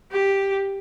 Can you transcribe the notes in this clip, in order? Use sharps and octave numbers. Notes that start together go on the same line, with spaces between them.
G4